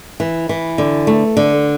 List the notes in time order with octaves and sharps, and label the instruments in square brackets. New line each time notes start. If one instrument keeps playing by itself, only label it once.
[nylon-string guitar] E3
E3
D3
A3
D3